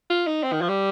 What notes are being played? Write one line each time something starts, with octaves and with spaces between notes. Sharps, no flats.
F4
D#4
C4
D#3
F3
G3